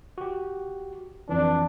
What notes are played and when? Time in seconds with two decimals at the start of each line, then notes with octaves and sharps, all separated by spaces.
0.18 F#4 G4
1.29 F2 E3 D4